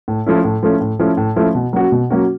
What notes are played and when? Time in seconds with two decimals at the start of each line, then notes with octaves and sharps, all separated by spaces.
0.08 A2
0.26 F3 A3 C#4 E4
0.44 A2
0.63 F3 A3 C#4 E4
0.80 A2
0.99 F3 A3 C#4 E4
1.17 A2
1.36 F3 A3 C#4 E4
1.55 B2
1.73 F#3 A#3 C#4 F#4
1.92 B2
2.10 F#3 A#3 C#4 F#4